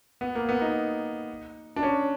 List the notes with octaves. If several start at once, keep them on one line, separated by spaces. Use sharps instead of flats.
B3
A#3
B3
D#4
D4
C#4